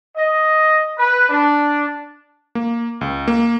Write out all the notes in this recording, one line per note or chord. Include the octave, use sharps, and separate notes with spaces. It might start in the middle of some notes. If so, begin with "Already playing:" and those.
D#5
B4
D4
A#3
C#2
A#3